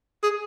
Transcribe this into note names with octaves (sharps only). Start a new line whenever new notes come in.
G#4